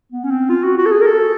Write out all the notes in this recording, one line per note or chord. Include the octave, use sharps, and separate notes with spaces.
B3
C#4
C4
F4
F#4
F#4
A4
G#4
A#4
A4